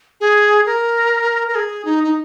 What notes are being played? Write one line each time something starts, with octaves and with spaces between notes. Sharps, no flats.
G#4
A#4
A#4
G#4
D#4
D#4